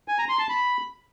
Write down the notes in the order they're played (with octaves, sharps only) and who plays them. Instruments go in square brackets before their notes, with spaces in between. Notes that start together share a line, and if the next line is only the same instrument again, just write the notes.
[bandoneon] G#5
A#5
C6
A5
B5